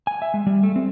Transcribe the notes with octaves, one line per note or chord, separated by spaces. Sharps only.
G#5
E5
G#3
G3
A3
C4